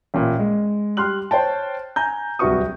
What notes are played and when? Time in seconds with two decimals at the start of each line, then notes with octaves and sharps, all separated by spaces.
0.14 A1 A#2
0.39 G#3
0.97 G3 C6 F6 F#6 F#7
1.31 C5 C#5 G5 A5
1.96 G#5 A#5 G6
2.39 D1 C2 F#4 B4 C#6 D#6